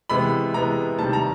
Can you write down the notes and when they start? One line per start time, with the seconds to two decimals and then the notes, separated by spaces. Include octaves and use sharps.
0.10 C3 E3 G#3 B3 B5
0.54 C3 E3 G#3 B3 A#5
0.99 C3 D#3 G3 A5
1.13 A#5